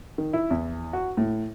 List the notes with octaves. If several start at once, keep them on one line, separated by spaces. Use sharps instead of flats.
D#3
E4
E2
F#4
A2